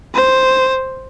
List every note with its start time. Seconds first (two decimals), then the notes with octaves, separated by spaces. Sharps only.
0.14 C5